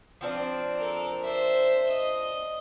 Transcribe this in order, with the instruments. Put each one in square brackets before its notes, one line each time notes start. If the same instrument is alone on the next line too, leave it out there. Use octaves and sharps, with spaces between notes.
[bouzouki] F3 C4 D4
[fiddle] A4 A#4
C5 E5
D#5